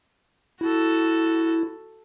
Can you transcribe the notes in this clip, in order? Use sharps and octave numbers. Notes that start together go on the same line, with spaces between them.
E4 F#4 A4